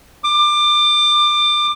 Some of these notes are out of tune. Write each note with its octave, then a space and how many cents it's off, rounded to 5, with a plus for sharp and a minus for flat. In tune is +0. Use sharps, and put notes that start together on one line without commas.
D6 +25